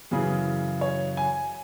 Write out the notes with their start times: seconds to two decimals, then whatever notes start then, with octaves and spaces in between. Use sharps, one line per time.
0.11 F#2 C#3 E3 G#4
0.81 C#5
1.17 G#5